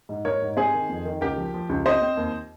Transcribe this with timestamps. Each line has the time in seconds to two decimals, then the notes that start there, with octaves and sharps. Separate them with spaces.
0.09 G#2
0.25 G#2 A#4 C#5
0.42 G#2
0.57 C3 G#4 C5
0.74 D#3
0.89 F2
1.05 D#3
1.21 C#2 G4 A#4
1.37 F3
1.54 F3
1.69 C#2
1.85 C4 C5 D#5
2.02 C4
2.17 D#2